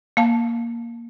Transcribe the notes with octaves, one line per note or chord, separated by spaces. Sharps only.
A#3 F5 A5